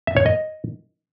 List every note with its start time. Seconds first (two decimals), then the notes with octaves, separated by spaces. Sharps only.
0.07 E5
0.17 C#5
0.26 D#5